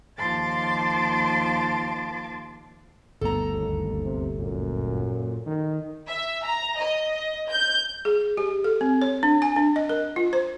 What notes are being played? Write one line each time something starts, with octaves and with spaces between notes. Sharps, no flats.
D#2 F3 A5 C6 D6 A6
G1 D2 B3 A4 A#5
D#2
C3
F#2 A#2
D#3
E5
A#5
D#5
D#5
G6
G#4
G4
A4
C4
C#5
D4
G#5
D4
D#5
A#4
F4
C5